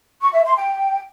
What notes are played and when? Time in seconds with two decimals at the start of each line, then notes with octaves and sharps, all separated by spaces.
0.21 C#6
0.33 E5
0.44 C6
0.56 G5